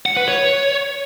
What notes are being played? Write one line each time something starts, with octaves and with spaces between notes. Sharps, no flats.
F#5
B4
C#5